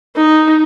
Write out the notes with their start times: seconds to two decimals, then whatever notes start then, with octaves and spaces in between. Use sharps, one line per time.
0.16 D#4